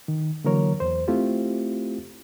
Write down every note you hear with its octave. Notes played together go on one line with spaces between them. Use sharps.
D#3
D3 E3 F#3 A#3 A#4 C#5
E2 C5
A3 C4 E4 F4 G4